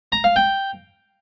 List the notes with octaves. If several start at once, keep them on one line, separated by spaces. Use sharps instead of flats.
A#5
F5
G5